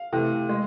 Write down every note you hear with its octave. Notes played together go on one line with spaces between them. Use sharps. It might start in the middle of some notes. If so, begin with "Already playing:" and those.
Already playing: F5
C3 E3 A3
G#3